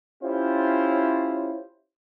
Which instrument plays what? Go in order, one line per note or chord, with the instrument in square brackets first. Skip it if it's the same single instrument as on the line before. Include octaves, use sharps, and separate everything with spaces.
[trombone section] C#4 E4 F4 G4 C5